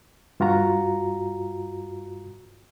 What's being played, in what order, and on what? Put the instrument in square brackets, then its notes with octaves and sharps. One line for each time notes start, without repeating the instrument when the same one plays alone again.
[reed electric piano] G2 F4 F#4 A#5